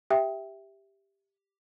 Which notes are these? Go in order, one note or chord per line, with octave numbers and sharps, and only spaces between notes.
G4 E5 G5